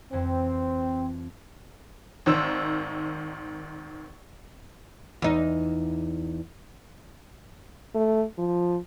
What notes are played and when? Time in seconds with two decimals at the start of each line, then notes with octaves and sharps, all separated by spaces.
0.13 F2 E3 C4
2.26 G#1 D#3 C5 E6
5.22 E2 D#4
7.95 A3
8.38 F3